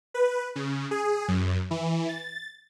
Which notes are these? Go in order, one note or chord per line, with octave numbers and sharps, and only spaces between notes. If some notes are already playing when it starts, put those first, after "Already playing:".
B4
C#3
G#4
F#2
E3
A6